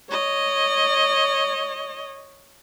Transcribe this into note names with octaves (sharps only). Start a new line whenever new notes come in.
C#5 D#5